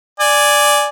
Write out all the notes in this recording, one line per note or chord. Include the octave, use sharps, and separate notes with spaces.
D5 G#5